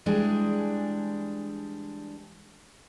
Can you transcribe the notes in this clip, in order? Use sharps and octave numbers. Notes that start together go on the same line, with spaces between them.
E3 G3 G#3 D4 G#4